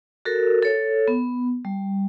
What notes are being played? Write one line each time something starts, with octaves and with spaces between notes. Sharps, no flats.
F#4 A4 A#4
A4 C#5
B3
G3